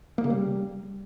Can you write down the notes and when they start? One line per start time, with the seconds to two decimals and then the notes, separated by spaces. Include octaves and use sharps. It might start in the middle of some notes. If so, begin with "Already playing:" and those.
0.18 A#3
0.24 C#3
0.30 G3